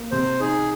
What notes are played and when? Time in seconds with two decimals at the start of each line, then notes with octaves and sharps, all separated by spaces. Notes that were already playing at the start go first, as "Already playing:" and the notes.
Already playing: A#3
0.11 C3 C5
0.40 D#4 G#4